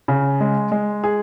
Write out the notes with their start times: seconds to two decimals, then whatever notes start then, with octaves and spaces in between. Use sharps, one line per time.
0.08 C#3
0.40 G#3
0.72 G#3
1.04 G#4